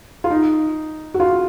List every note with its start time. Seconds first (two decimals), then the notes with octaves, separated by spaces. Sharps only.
0.24 F4
0.30 D#4
1.14 F#4
1.20 F4